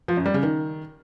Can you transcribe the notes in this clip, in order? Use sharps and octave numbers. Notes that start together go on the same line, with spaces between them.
F3
F#2
G3
C#3
D#3